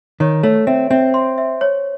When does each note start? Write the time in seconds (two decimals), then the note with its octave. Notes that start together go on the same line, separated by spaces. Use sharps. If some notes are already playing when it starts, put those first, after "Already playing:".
0.20 D#3 C#5
0.43 A3 C#5
0.67 C4 E5
0.90 C4 E5
1.14 C6
1.38 E5
1.61 C#5